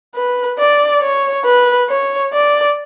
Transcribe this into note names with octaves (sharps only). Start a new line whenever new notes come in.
B4
D5
C#5
B4
C#5
D5